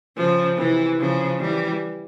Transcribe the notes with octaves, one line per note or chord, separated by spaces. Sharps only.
C#3 F3
C3 E3
C#3 F3
E3 G3